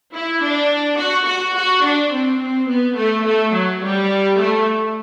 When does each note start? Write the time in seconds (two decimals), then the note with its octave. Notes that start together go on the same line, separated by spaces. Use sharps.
0.15 E4
0.43 D4
0.99 F#4
1.27 F#4
1.56 F#4
1.84 D4
2.13 C4
2.40 C4
2.69 B3
2.97 A3
3.25 A3
3.53 F#3
3.82 G3
4.39 A3